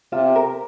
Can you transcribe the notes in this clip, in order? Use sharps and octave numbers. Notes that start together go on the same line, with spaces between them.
C3 F4
A#4